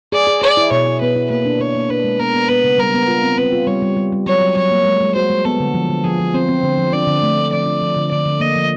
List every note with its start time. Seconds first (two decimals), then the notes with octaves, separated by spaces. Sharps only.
0.12 G#4 D5
0.27 G#4
0.42 G#4 D5
0.57 E4
0.71 B2 C#5
0.87 E4
1.01 B3 B4
1.16 E4
1.30 A#3 B4
1.45 D4
1.60 D4 C#5
1.75 A#3
1.89 D4 B4
2.04 G#3
2.19 B3 A#4
2.34 B3
2.49 B3 B4
2.64 C#3
2.78 G3 A#4
2.94 B3
3.08 F4
3.23 C4
3.38 C4 B4
3.52 F4
3.67 G3 C#5
3.82 G3
3.96 G3
4.12 G3
4.26 F#3 C#5
4.41 F#3
4.56 F#3 C#5
4.71 A#3
4.85 G#3
5.00 G#3
5.15 F#4 C5
5.30 G#3
5.45 B3 A4
5.60 D3
5.74 F3
5.89 D3
6.04 F3 G#4
6.19 F3
6.34 C4 C5
6.49 C4
6.63 D3
6.78 F3
6.93 D4 D5
7.07 D3
7.22 A3
7.37 A3
7.52 F3 D5
7.66 D4
7.82 F3
7.96 D3
8.11 D3 D5
8.26 D3
8.40 A#3 D#5
8.56 F3